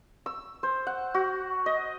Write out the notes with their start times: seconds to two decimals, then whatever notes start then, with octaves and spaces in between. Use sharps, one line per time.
0.26 E6
0.63 C5
0.87 F#5
1.14 F#4
1.66 D#5